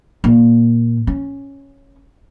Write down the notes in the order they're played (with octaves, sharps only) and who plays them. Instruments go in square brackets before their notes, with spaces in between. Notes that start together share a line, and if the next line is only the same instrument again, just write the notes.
[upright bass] A#2
C#4